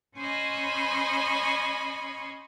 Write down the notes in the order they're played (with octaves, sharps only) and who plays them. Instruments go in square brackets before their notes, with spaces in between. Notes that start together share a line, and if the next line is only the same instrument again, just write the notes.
[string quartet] C#4 C5 C#5 D#5 G#5 B5